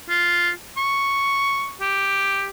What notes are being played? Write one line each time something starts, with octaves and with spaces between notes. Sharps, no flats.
F4
C#6
G4